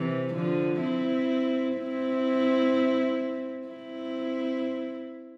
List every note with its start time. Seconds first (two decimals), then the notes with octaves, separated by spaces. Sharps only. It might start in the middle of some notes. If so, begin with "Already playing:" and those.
Already playing: C3 E3
0.34 D3 F3
0.81 C4 E4
1.77 C4 E4
3.68 C4 E4